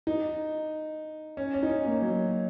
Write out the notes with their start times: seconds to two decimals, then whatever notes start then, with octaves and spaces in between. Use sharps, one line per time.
0.07 D#4
1.37 C#4
1.54 C#4
1.63 D#4
1.70 C#4
1.86 A#3
2.02 F#3